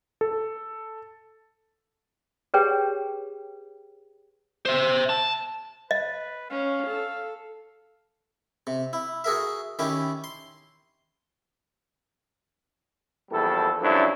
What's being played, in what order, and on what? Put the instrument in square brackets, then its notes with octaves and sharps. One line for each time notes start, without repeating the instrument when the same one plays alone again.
[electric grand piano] A4
[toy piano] G4 G#4 B4 C#5 G5
[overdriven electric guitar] C5 E5
A5
[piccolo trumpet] B4 [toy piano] D#5
[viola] C#4 [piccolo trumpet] F5
[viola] A4
[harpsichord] C3
E4
F#4 G#4 A#4 E5
D#3 C#4 E4 G4
C6
[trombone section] A#1 E2 G3 A4
C2 F#2 F3 D4 E4